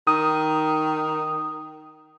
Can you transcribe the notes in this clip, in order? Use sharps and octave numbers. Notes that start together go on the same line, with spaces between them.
D#3 D#6